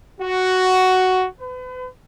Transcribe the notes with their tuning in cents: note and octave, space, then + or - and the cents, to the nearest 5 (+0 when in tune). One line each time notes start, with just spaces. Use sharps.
F#4 +5
B4 +40